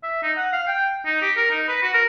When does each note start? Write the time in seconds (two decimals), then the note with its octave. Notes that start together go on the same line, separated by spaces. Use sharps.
0.03 E5
0.23 D#4
0.37 F#5
0.53 F5
0.67 G5
1.05 D#4
1.22 G4
1.37 A#4
1.51 D#4
1.68 B4
1.82 F#4
1.94 A#4